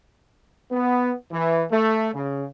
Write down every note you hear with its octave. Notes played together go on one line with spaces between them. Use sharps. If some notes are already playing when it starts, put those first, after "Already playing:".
B3
E3
A3
C#3